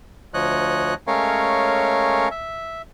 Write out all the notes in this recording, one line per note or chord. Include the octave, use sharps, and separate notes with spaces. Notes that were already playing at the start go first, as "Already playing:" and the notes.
D2 F3 C#5 D#5 F#6
G#3 A3 C#4 A#4 C#5 F5
E5